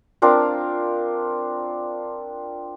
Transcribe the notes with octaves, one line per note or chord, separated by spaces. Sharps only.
C4 D4 F4 A#4